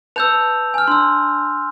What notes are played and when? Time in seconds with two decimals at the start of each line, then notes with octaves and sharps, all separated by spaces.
0.16 B4 A5 E6 G6 F7
0.74 G#5 F6
0.88 D4 C6 E6